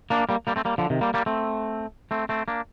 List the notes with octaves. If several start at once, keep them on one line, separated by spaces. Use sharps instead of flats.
A#3 D4
G3 A#3
G3 A#3
A3 C4
G3 A#3
D3 F3
C3 D#3
G3 A#3
G3 A#3
A3 C4
A3 C4
A3 C4
A#3 D4